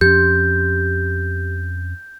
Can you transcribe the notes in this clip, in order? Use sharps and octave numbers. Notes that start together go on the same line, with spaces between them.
F2 C#4 G4 G6